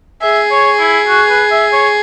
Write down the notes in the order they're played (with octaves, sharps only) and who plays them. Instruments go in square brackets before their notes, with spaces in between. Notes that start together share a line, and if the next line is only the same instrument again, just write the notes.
[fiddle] G#4 [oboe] E5
[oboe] C#5
E4
F#4
B4
E5
C#5